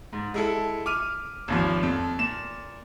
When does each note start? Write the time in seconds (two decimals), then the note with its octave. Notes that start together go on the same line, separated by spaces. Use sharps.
0.13 G#2
0.34 G#3 E4 A4
0.86 D6 F6 D#7
1.48 G#1 D#2 F3
1.83 F2
2.19 A#2 E7